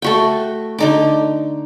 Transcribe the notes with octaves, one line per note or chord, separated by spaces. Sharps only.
A3 F#4 G5
D3 D#4 D6